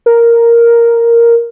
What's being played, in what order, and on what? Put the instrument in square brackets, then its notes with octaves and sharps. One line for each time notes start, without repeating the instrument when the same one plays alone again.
[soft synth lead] A#4